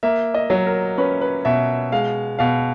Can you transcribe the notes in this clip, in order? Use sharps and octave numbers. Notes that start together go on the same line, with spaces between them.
A#3 E5
D#5
F#3
A#4
C#4 B4
B4
B2 E5
G#3 F5
B2 F5